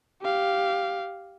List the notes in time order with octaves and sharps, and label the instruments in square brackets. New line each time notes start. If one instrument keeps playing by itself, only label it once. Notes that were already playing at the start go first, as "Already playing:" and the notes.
[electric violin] G4 F5